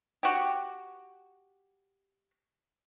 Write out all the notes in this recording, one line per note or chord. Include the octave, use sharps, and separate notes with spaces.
F#4 G4